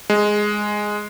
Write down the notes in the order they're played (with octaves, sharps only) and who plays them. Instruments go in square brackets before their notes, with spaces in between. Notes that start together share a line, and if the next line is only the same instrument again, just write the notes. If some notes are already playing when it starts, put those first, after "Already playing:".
[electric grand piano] G#3